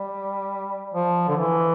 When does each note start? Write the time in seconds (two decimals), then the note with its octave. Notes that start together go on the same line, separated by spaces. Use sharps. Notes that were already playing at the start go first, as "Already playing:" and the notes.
Already playing: G3
0.94 F3
1.28 D3
1.36 E3